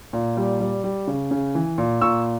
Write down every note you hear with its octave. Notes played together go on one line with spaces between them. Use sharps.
A#2
G3
G3
G3
C#3
C#3
E3
A#2
A#2 C#6 E6